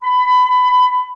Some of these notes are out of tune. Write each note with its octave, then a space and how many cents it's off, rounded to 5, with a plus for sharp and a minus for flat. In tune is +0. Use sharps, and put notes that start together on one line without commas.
B5 +20